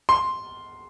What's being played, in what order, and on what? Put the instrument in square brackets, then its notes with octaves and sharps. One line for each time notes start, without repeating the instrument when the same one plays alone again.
[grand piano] C6